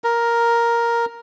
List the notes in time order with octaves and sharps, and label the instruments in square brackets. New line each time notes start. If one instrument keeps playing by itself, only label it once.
[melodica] A#4